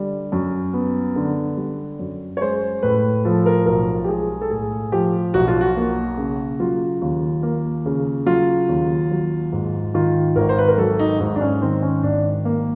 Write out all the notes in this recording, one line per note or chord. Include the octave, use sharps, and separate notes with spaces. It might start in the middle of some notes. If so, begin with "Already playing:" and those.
Already playing: D3 G3
F#2
B3
D3
G3
F#2
C#5
G#3 C5
A2 B4
F3 A4
A#4
B1 A#4
G4
G#3 G#4
A4
A2 G#4
F3 G4
B1 F#4
F4
F#4
A#3
C#3
F#3 F4
D#2
A#3
C#3
F#3 F4
D#2
F#3
G#2
D#3 F4
G#1 A#4
C5
B4
A#4
F#3 A4
D#4
G#2 D#4
D4
C#4
D#3 C4
C#4
G#1 D4
A#3